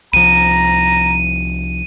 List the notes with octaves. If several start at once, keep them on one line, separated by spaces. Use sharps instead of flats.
C2 F3 A#5 D#7